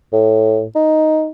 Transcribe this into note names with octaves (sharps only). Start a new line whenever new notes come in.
A2
D#4